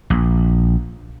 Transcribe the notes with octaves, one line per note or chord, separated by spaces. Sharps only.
A#1